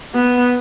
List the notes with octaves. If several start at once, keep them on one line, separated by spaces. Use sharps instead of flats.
B3